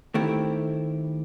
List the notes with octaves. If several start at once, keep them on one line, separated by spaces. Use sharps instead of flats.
D#3 A3 C4 E4 G4